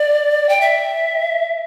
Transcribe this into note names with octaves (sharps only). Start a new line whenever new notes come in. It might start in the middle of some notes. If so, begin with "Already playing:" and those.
Already playing: D5
G5
E5